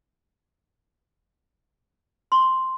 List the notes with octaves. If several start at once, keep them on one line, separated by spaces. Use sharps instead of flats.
C6